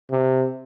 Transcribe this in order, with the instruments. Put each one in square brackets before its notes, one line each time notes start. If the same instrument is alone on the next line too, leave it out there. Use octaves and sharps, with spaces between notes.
[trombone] C3